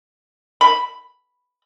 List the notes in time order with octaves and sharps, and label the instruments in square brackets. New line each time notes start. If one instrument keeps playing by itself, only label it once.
[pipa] B5